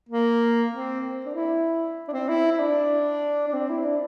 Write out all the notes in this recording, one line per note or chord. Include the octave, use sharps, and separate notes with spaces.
A#3
C4
D4
E4
D4
C4
E4
E4
D4
D4
C4
E4
D4